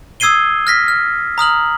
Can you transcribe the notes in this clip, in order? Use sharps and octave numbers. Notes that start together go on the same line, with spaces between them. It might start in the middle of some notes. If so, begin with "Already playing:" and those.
D#6 E6 G#6 C7 D#7 G7
F6 A#6 B6
F6
A#5 D#6 F6 F#7